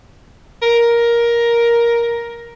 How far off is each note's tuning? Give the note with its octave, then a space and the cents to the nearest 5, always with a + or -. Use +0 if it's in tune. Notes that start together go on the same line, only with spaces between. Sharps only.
A#4 +10